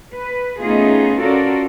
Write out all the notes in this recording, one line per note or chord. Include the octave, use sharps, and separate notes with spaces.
B4
A3 B3 C#4 D#4 F4 G#4
C#4 F4 F#4 A4 A#4 D5